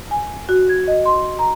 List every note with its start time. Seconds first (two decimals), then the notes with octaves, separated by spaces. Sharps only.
0.11 G#5
0.49 F#4
0.69 G#6
0.88 D#5
1.06 C6
1.39 A#5